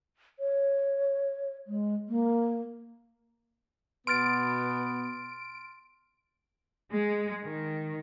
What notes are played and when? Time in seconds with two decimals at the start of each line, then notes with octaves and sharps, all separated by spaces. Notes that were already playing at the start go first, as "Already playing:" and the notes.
0.40 C#5
1.67 G#3
2.09 A#3
4.07 B2 B3 C6 F6 A6 D7
6.91 G#3
7.43 D#3